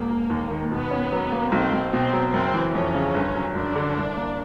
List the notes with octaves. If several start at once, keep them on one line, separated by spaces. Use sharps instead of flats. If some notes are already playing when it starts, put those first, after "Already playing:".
Already playing: E1 A#3
E1
D#2
D#3
B2 B3
C#4
F#3
A#3
B1 C4
B1
B2 C4
F#3
F#1 C4
E3
F2 C#4
C#3
G1
F#3
F#2 D4
D3
C2
A#3